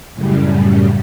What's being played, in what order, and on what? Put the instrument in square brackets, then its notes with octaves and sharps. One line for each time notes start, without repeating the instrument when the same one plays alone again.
[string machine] F#2 A2 C#3 G3